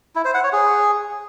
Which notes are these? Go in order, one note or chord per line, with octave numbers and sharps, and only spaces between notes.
E4
C5
F#5
C#5
G#4